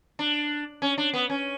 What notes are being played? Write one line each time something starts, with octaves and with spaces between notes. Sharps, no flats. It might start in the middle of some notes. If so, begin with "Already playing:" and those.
D4
C#4
D4
B3
C#4